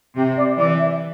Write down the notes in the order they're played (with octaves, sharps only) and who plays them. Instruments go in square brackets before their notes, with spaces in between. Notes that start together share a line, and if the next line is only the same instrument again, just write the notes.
[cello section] C3 [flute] G4
[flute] D5
[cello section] E3 [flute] D5
[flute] E5